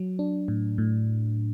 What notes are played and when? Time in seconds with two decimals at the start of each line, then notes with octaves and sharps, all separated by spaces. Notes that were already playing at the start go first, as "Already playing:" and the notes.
Already playing: F#3
0.19 D4
0.48 A2
0.78 A2